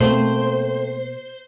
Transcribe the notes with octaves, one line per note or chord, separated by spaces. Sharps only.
B2 A3 A#3 C4 C5